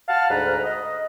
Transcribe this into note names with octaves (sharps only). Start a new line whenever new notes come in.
F5 F#5 A5 F6
D2 G#2 B4 A#5
D#5